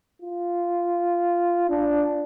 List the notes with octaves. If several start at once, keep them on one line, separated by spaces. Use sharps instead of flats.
F4
D4